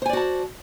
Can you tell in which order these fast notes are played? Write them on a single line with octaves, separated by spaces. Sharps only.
C5 G#5 D5 F#4 A5